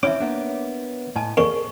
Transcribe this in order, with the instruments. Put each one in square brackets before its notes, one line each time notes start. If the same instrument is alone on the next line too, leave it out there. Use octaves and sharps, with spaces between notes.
[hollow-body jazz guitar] C4 C#4 E4 [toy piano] C#5 E5 [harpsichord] D6
[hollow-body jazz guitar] A#3 B3 D4
[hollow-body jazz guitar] A2 G#5 [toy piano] D#5 A5
[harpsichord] F2 A#2 [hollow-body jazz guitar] G#4 [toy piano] C#6